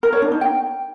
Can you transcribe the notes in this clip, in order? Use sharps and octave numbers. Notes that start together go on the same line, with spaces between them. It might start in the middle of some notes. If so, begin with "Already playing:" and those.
A#4
C#5
D4
D#4
G5